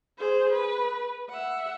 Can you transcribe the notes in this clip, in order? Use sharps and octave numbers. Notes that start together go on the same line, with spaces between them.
G#4 C5
B4
E5 F#5